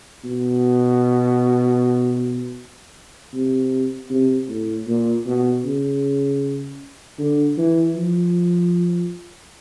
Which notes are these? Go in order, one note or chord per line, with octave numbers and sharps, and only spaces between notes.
B2
C3
C3
A2
A#2
B2
C#3
D3
E3
F3